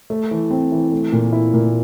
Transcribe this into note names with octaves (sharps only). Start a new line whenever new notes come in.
A3
E3
C4
E3
A3
A#2
E4
A#2